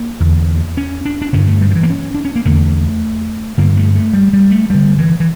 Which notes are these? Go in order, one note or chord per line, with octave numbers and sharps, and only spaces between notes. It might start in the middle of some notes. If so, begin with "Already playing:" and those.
Already playing: A#3
E2 D3
C#4
D4
D4
G2 D3 C#4
A3
G3
F3
E3
A#3
C#4
D4
C#4
A#3
E2 D3 A3
G2 D3 A#3
A3
A3
G3
G3
A3
G2 D3 G3
E3
E3